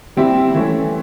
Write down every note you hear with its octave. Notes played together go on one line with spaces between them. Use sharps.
G3 C4 E4 G4
E3 A3 C#4